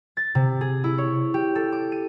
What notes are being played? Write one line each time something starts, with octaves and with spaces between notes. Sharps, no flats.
A6
C3
G#4
E4
C#5
G4
A4
D6
D#7